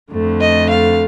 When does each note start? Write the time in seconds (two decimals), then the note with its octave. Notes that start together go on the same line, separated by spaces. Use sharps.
0.12 F2 D3 A3
0.41 D#5
0.71 F5